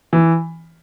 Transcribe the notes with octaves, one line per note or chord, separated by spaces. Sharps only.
E3